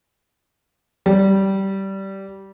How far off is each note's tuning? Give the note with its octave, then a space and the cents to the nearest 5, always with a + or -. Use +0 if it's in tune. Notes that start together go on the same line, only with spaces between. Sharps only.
G3 -15